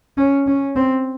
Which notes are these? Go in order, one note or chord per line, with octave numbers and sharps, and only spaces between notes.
C#4
C#4
C4